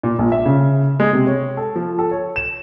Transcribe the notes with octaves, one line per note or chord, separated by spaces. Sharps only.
A#2
A#1
E5
C#3
G#3
C3
C#5
A4
F3
A4
C#5
E7